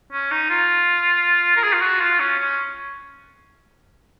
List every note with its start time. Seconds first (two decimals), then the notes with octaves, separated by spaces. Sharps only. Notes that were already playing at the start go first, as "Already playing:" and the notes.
0.12 C#4
0.31 D#4
0.50 F4
1.57 A#4
1.63 G#4
1.73 F4
1.82 F#4
2.00 F4
2.19 C#4
2.39 C#4